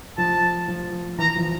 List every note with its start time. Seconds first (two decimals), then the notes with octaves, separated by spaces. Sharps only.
0.18 F3 A5
0.68 F3
1.18 E3 A#5
1.36 F3